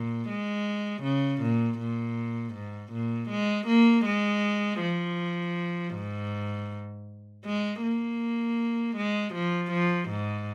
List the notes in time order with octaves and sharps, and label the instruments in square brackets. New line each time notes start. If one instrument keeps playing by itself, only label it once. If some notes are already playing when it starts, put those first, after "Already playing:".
Already playing: [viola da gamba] A#2
G#3
C#3
A#2
A#2
G#2
A#2
G#3
A#3
G#3
F3
G#2
G#3
A#3
G#3
F3
F3
G#2